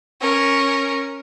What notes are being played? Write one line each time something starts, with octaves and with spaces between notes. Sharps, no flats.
C#4 A#4